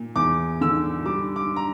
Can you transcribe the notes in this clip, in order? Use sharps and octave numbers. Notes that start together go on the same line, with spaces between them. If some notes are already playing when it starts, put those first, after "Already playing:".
Already playing: A#2
E2 D6
D3 E6
G3 D6
D6
A#5